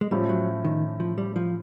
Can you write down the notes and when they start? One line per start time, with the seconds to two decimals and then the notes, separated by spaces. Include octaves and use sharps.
0.01 G#3
0.11 A2 F3 G3 A3 C#4
0.29 F#3
0.64 D#3
1.00 F3
1.18 G3
1.36 F3